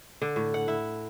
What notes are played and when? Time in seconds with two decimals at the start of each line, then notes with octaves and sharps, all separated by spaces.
0.22 D3
0.36 A2
0.54 F#5
0.68 E4